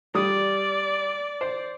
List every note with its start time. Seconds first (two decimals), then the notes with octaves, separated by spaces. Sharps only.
0.15 G3 D5 D#6
1.41 C5